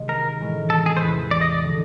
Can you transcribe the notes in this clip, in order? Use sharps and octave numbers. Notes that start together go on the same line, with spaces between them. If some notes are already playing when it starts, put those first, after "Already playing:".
Already playing: C3 D#3 G#3
A#4
A2 E3 G#3 C#4
A4
G#4
C5
E2 C3 E3 B4
D5
D#5
D5
D3 F3